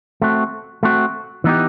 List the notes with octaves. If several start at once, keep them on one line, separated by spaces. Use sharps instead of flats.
A3 C4 F#4
A3 C4 F#4
E3 B3 D#4 G4